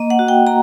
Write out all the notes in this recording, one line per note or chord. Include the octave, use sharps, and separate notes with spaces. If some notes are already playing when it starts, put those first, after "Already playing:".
Already playing: A#3 D#5
F#5
F#4
G5
A#3 A#5